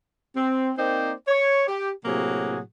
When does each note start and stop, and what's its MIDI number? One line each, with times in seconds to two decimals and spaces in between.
0.37 0.71 60
0.78 1.12 58
0.78 1.12 60
0.78 1.12 63
0.78 1.12 72
0.78 1.12 74
0.78 1.12 79
1.28 1.63 73
1.68 1.90 67
2.05 2.60 45
2.05 2.60 48
2.05 2.60 54
2.05 2.60 58
2.05 2.60 66
2.05 2.60 68